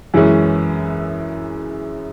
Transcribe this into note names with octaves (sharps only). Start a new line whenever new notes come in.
F#2 E3 G#3 C#4